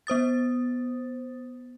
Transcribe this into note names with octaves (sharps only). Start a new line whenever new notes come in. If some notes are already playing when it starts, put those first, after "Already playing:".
B3 C5 D#6 A6